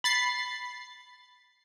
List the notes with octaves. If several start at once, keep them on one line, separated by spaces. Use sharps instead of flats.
B5 A6 C7